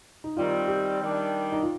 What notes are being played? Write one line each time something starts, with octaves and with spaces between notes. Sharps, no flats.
D#4
D#3 G3 C4 F4
G4
D#3 G3 D4
D#4
F4